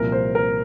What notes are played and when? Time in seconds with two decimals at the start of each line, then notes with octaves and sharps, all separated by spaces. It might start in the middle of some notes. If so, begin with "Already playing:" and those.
Already playing: C2 A#2 F3 A#4
0.12 C5
0.35 A#4